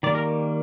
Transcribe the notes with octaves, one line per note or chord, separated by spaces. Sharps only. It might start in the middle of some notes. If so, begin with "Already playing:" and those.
D#3 G3 A#3 D5
A#4